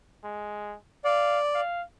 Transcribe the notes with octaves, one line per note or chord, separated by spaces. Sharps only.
G#3
D5 F5
F5